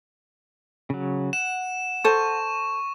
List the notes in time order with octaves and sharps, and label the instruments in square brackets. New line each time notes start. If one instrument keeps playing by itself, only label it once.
[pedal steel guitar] C#3 F#3
[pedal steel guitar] F#5 [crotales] E7
[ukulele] A4 C5 [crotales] C#6